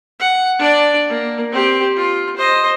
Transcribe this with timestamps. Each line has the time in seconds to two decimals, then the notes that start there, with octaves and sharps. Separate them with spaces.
0.20 F#5
0.59 D4 D5
1.09 A#3
1.53 C4 G4
1.96 F4
2.37 C5 D#5